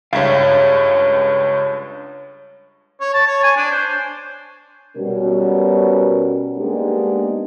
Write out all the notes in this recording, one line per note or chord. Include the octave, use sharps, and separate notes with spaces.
C#2 G2 C#5 E5 F5
C#5
A5
C#5
G#5
D4
C5
B2 G3 C#4 F#4 A#4
G#3 A#3 B3 D4 D#4 G4